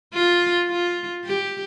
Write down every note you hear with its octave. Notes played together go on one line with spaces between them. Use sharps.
F4
F4
G4